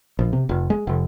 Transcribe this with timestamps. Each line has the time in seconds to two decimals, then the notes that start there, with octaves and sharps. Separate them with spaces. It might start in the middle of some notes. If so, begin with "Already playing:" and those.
0.19 A#1
0.33 C3
0.49 F1
0.70 G#3
0.87 F1